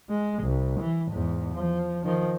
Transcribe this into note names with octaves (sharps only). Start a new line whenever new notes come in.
G#3
C2
E3
E2 G#2
F3
D#3 F3